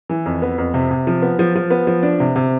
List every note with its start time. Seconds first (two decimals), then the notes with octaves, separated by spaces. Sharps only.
0.09 E3
0.26 F2
0.42 B3
0.58 F2
0.74 C3
0.91 C3
1.07 F3
1.22 B3
1.39 F3
1.55 F3
1.70 B3
1.87 F3
2.03 D4
2.20 C3
2.36 C3